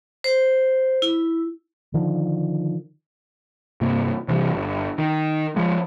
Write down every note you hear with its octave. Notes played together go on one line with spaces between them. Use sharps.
C5
E4
D3 D#3 F3
G2 C3 A#3
C3 E3 F3 G3
G1
D#3
F3 G#3